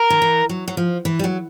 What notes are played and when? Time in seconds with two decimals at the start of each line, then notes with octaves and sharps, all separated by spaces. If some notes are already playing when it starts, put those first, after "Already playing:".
Already playing: A#4
0.10 D#3
0.22 E3
0.49 F#3
0.68 F#3
0.77 F3
1.05 E3
1.19 G3
1.24 F#3